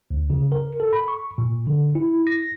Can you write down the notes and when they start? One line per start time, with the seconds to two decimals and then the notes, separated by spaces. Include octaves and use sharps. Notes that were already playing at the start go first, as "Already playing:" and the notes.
0.11 D2
0.30 C#3
0.52 A#4
0.80 A4
0.93 B5
1.08 C#6
1.38 A#2
1.67 D3
1.95 E4
2.27 A#6